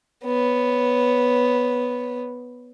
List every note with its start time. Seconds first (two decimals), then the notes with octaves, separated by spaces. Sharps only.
0.24 B3 C#5